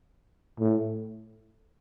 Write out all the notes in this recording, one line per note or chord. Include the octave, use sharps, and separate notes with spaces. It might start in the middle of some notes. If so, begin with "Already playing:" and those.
A2